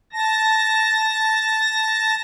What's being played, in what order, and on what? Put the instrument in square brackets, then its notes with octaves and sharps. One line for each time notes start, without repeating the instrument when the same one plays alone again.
[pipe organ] A5 A#6